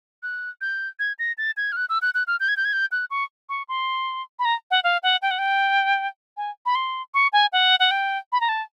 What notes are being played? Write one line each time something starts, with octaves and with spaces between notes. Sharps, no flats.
F#6
G6
G#6
A#6
A6
G#6
F6
F#6
E6
F#6
F#6
F6
G6
G#6
G6
G#6
G6
F#6
C#6
C#6
C6
B5
A#5
F#5
F5
F#5
G5
F#5
G5
G#5
B5
C6
C#6
G#5
F#5
F#5
G5
B5
A#5
A5